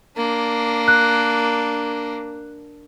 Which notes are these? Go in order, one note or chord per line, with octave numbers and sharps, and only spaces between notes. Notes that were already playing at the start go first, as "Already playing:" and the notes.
A#3 D4
F#6